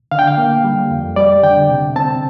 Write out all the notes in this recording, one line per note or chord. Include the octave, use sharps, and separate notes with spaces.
D3 F5
G5
F5
A#3
G3
F2
G3 D5
D3 G5
C3
C4 A5